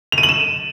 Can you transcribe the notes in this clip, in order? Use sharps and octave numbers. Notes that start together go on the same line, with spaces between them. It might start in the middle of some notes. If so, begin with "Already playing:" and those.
F7
D#7
F#7
E7